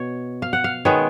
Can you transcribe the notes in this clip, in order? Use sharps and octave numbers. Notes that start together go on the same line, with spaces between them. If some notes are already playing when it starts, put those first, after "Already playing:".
Already playing: B2 C#5
F5
F#5
F5
D#3 G#3 B3 C#5